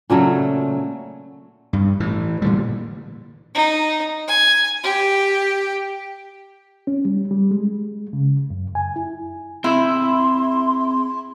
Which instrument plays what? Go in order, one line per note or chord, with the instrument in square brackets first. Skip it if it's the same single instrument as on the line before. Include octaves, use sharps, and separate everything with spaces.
[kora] A#2 C#3 F#3 A3
[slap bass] G2
A2 E3
A#2 D3 G3
[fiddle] D#4
G#5
G4
[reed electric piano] C#4
G3
G3
G#3
C#3
F#2
G#5
E4
[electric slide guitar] C4 G#4 E5 [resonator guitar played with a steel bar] E4 [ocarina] C6